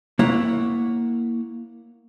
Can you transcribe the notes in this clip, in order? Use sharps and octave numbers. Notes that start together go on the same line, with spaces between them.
A#3 E4 C#5 F#5